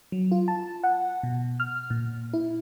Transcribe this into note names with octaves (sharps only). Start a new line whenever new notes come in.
F#3
F4
A5
F#5
B2
F6
A#2
E4